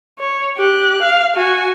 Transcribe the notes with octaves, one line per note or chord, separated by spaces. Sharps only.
C#5
G4 F#6
F5
F#4 G#5